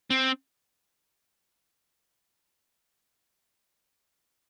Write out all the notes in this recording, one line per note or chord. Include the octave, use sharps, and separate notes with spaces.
C4